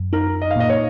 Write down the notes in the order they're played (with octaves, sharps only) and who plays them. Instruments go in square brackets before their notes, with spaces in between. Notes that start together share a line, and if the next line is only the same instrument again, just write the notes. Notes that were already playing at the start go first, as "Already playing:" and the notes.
Already playing: [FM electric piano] F#2
[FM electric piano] D#4 [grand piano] A#4
[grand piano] D#5
F5
[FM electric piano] A#2 [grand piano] D#5
[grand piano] C#5